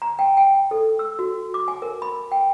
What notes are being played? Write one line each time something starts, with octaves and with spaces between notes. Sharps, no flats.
A#5
G5
G5
A4
E6
F#4
D6
G#5
A#4
B5
G5